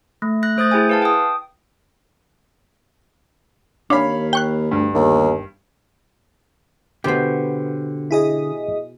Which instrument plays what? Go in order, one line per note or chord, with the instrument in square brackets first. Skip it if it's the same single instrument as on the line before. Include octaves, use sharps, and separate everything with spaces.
[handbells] A3
F#6 A#6
A3 C5 D#6 G6 A6
E4 G#4 G5 G#5
B4 F5 A5
G5 D#6
[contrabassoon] D#2 [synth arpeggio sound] D4 [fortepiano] C#5 F5 B5
[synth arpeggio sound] G5 C#6 F#6
[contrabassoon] D2 [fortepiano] G2
[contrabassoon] G1 [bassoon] D#2
[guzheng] B2 B3 [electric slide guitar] D3 [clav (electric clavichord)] G4 C5
[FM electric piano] E4 G#4 D#5